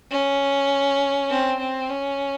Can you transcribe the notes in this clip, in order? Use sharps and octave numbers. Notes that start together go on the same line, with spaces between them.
C#4
C4
C4
C#4